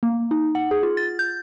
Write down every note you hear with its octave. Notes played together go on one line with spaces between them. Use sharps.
A#3
D#4
F#5
G#4
F4
A6
G6